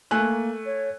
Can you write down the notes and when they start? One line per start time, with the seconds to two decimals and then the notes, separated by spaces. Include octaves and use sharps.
0.11 A3 A#3 G#5 F#6
0.66 C#5